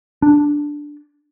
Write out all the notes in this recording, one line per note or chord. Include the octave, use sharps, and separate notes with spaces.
D4